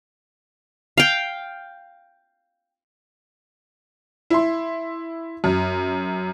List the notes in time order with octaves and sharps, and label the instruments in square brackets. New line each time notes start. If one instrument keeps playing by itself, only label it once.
[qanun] F5 G5
[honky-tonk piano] E4 C6
F#2